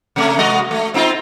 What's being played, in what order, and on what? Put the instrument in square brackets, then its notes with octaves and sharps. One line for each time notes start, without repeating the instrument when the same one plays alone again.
[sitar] C3 A3
G#3 F#4 D#5
A3
C4 D#4 F4